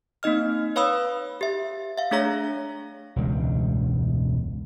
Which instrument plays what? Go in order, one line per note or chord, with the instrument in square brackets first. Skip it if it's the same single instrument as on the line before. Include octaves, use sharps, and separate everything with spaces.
[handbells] A#3 C4 D#4 D#5 F6
B4 C#5 F5 B5 D#6 E6
G4 E5
E5 F5
A3 D4 G#4 C#5 A#5 A#6
[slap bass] E1 C#2 G2